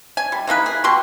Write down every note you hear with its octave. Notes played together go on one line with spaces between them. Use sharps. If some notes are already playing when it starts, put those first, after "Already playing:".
G#5
G3
E3 A#3 D#4 B4
G#4
B2 G4 C6 C#6